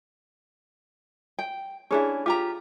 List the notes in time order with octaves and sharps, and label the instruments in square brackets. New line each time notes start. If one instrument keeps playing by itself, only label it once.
[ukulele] G5
[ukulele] C#4 D4 E4 [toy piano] G4 G#4
[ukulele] F4 G4 A#5 [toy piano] F5 D6